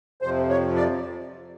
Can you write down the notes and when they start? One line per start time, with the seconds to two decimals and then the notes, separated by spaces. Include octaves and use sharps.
0.22 F2 C3 F3 C5
0.49 C#5
0.76 D5